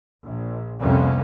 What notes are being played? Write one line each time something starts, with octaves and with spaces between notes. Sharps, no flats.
A#1
C2 F2 C3 A#3 B3 C#4